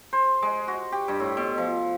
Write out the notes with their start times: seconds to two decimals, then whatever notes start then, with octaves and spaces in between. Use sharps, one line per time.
0.13 C5
0.42 G#3
0.68 F#4
0.92 G4
1.08 G2
1.20 A2
1.37 B2
1.58 F3